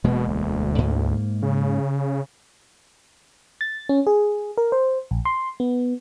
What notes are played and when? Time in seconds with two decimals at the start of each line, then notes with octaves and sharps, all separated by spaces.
0.04 E1 B2 G#3 A#3
0.28 D2
0.78 G#2 A#3
1.42 C#3
3.61 A6
3.89 C#4
4.07 G#4
4.58 A#4
4.72 C5
5.11 A#1
5.25 C6
5.60 B3